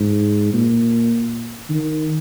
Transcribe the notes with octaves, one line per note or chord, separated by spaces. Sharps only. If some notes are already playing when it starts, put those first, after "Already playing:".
Already playing: G#2
A#2
D#3